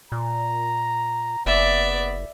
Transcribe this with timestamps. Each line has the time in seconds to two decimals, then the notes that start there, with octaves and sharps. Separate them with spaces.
0.12 A#2 A#5
1.46 F#1 B3 D5 E5